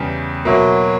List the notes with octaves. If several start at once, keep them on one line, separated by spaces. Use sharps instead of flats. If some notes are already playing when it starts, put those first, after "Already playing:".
Already playing: E2 C#3 G3
B2 F#3 A#3 E4